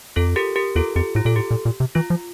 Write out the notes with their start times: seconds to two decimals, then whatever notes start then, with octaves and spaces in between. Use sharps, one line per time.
0.16 F2 F4 A4
0.36 G4 A#4
0.56 G4 A#4
0.76 E2 F4 A4
0.96 F2 G4
1.15 A2 F4
1.25 A#2 A4
1.36 A2 G4
1.51 A#2
1.65 A#2
1.80 C3
1.95 E3 F4
2.10 F3